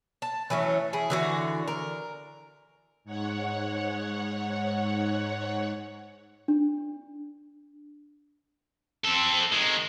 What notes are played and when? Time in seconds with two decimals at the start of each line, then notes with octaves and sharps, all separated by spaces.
0.22 A5
0.50 E3 F#3 A3 C#4
0.93 E4 G#4
1.10 D3 E3 F#4
1.68 A#4
3.04 G#2 C#5 F#5
6.48 D4
9.04 C4 A4
9.52 D#3 G#3